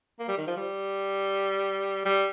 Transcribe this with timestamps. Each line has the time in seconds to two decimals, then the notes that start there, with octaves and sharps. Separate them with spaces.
0.19 A#3
0.28 G3
0.38 D#3
0.47 F3
0.57 G3
2.05 G3